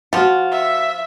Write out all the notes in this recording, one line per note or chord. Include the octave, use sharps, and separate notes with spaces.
F3 F4 F#4 F#5
E5